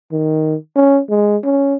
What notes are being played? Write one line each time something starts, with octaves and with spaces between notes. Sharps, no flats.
D#3
C#4
G#3
C#4